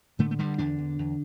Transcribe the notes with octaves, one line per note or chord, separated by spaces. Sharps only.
A2 D3 A3
A3
G2 D3 G3
E2 D3 D4
E2
E2